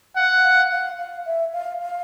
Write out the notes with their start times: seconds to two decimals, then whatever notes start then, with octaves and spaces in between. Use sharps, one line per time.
0.16 F5 F#5
0.43 F5
0.71 F5
0.98 F5
1.26 E5
1.54 F5
1.81 F5